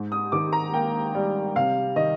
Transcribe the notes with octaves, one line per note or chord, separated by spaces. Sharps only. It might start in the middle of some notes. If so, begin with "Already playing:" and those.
Already playing: G#2
D#6
D#3 D6
A#5
A#3 G5
G3
C3 F5
D#3 D#5